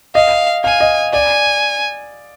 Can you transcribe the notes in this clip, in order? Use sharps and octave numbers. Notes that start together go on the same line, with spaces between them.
D#5 F5
F5 G#5
D#5
D5 G#5